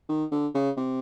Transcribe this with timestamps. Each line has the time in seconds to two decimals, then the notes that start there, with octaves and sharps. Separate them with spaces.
0.09 D#3
0.32 D3
0.55 C#3
0.77 C3